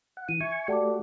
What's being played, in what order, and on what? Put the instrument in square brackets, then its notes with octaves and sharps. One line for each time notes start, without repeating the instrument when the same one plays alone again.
[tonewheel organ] F#5
[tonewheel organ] E3 [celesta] D#7
[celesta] E5 [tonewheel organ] G#5 C#6
[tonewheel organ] A3 F#4 G4 [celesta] D5 A5 D6